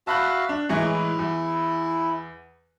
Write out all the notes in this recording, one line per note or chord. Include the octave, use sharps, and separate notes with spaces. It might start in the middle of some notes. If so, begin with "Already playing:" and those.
F#4 E5 F5 A5 B5 F#6
D4
A2 E3 G#3 G#5 A#5 C#6
E4
E2